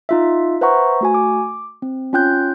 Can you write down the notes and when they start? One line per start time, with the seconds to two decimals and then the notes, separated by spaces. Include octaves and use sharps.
0.09 D#4 F4 E5
0.61 B4 C5 E5 F#5 A#5 C#6
1.01 A3 F#4 G#5
1.14 D6
1.82 C4
2.13 C#4 F4 G5 F#6 G6